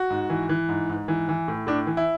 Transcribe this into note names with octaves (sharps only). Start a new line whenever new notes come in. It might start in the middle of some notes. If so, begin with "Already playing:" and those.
Already playing: F#4
G#2
E3
E3
G#2
G#2
E3
E3
A2
A2 D4
E3
E4